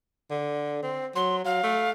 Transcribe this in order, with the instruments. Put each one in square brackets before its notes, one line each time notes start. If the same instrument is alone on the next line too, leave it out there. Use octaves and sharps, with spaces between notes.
[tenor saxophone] D3
C4
[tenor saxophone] F#3 [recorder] C6
[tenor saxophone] F#3 [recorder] F5
[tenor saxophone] A3